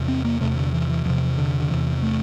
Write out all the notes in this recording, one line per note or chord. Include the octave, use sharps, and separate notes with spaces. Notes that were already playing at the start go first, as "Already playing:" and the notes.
Already playing: E2 C3
C4
A#3
E2 C3 A3
D3
E3
E3
E2 C3 F3
D3
D3
E2 C3 E3
A3